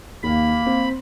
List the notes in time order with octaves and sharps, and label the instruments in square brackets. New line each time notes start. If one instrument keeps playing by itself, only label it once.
[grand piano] D#2 [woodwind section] A#3 [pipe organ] B5
[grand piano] C4